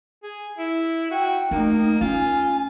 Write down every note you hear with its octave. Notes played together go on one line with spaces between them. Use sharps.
G#4
E4
F#4 G5
A3 A#3 D#4
C#4 F4 G#5